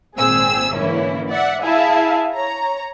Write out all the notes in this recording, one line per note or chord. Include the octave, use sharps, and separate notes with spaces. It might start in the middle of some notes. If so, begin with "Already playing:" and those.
G#1 A#2 C4 G#4 E6
G#2 D3 E3 A#3 C#4 E4
D5 E5 F#5
E4 G#4 E5 F5 A5
C#5 A#5